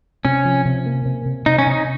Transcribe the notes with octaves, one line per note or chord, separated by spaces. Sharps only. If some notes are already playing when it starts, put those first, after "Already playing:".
C3 C#4
F3
C3
A#3
C3
C3
C3 D#4
C#4
C3 D#4